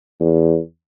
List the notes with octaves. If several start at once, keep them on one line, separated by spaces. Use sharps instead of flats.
E2